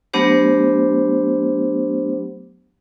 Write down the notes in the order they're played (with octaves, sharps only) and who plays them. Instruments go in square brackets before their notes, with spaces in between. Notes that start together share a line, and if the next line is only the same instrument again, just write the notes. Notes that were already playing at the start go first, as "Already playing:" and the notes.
[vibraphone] F#3 A3 B3 D4 G4 C5